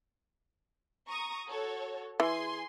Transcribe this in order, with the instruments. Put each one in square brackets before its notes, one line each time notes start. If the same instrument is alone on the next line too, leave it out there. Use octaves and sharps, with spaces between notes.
[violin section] A#5 C#6 D#6
F#4 A4 C#5
[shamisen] E3 [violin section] G#4 G#5 C6